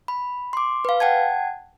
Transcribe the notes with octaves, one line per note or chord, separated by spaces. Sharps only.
B5
C6 D6
B4 F5
F#5 G5 A5 G#6